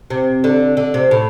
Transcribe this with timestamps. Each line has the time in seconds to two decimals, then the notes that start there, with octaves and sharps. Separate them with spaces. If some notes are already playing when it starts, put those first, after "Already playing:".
0.10 C3
0.44 D3
0.77 D3
0.94 C3
1.11 A2